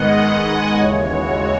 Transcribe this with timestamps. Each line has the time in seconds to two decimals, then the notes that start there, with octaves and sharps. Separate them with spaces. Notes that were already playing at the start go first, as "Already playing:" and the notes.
Already playing: G#2 D#3 G#3 B3 D#5 F#5
0.50 G#5
0.80 D#2 C#3 E3 G#3 C#5
1.09 F#4